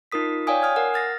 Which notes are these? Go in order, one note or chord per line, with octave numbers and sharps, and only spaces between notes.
D#4 F4 A#4 D#6 B6
C#5 D5 F5 G5 G#5 D#6
G#5 D#6 F6 G#6
A#4 F#5
F6 A6 A#6